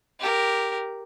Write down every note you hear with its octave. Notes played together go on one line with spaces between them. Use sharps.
G4 A#4